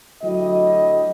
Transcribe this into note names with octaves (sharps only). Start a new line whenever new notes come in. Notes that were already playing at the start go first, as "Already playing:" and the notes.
D2 F#3 E4 G4 D#5